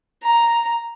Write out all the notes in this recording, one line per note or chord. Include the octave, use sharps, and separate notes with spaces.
A#5